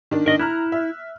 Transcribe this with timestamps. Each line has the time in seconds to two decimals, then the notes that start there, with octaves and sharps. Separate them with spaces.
0.11 D#3 D4
0.26 D#3 D4 A#4 D#5
0.39 E4 A#5 F6 F#6
0.72 E5